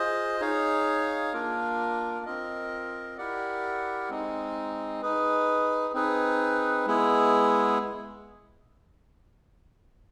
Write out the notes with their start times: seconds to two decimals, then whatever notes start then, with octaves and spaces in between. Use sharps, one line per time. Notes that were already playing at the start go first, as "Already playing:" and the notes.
Already playing: F4 G#4 C5 D#5
0.41 D#4 G#4 C#5 F5
1.33 A#3 D4 F4 A#4
2.25 C4 F4 A#4 D#5
3.18 E4 G4 A#4 D5 F#5
4.10 G#3 C4 D#4
5.02 D#4 G#4 B4
5.94 C4 D#4 G#4 B4
6.86 G#3 B3 E4 G#4